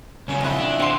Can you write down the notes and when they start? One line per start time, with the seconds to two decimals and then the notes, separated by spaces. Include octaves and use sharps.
0.28 B1 A#2 C#3 C#4
0.41 F2 E4 D#5 F#5
0.60 D4
0.80 D3 C4 G4 C6